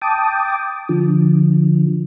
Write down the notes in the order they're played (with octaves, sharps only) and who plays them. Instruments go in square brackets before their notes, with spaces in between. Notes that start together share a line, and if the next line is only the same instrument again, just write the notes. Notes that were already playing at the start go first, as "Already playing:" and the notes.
[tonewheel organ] G5 A5 D6 D#6
D3 F3